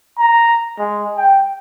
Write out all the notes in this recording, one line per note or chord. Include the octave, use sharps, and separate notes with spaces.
A#5
G#3
G5